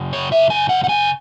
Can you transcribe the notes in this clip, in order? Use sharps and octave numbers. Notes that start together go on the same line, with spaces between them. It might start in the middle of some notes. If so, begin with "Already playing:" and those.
Already playing: F#2 C#3
C#5
E5
G#5
F#5
F#5
G#5